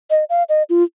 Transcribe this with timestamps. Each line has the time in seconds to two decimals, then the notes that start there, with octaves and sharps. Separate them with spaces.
0.10 D#5
0.29 F5
0.49 D#5
0.70 F4